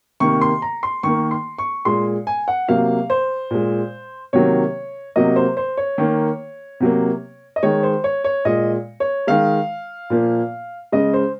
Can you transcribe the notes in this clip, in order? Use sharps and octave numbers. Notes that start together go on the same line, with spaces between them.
C3 D#3 A#3 C#6
C6
A#5
C6
D#3 A#3 C#6
C6
C#6
A#2 G#3 C6
G#5
F#5
C3 F#3 A#3 F5
C5
A#2 G#3
C3 D#3 F#3 A#3 C#5
C3 F#3 A#3 D#5
C5
C5
C#5
D#3 A#3
C3 F#3 A#3
D#5
D#3 G#3 C#5
C5
C#5
C#5
A#2 G#3 D#5
C#5
D#3 G#3 F5
A#2 F3 A#3
C#3 G#3 D#5
C5